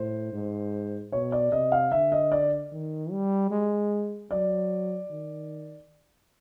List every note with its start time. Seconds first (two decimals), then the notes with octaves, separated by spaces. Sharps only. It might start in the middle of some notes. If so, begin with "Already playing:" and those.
Already playing: A2 C5
0.32 G#2
1.12 B2 C#5
1.32 D5
1.52 C3 D#5
1.72 F5
1.92 D3 E5
2.12 D#5
2.32 D5
2.72 D#3
3.11 G3
3.51 G#3
4.31 F#3 D5
5.10 D#3